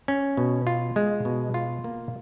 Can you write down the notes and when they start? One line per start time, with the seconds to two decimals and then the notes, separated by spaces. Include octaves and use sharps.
0.08 C#4
0.37 B2
0.67 F4
0.96 G#3
1.25 B2
1.54 F4
1.84 A#3